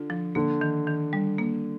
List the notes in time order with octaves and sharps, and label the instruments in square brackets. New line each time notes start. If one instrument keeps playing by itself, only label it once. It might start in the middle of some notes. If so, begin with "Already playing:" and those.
Already playing: [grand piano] D3 [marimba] F4
[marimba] F3
[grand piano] D3 [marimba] A#3
[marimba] D#3
D#3
G3
A#3